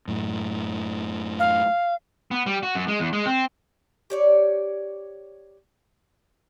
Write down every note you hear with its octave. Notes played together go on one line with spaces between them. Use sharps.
F#2 A2
F5
B3
G3
F#4
F#2
G#3
E2
G#3
C4
G4 C#5 D5